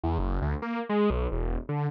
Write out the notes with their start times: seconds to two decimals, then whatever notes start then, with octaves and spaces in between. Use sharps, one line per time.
0.04 E2
0.19 F#1
0.42 D2
0.62 A#3
0.89 G#3
1.10 B1
1.32 E1
1.69 D3